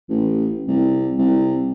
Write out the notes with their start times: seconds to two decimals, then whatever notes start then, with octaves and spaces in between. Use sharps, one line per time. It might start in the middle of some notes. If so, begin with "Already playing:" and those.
0.10 A1
0.68 C2
1.18 C2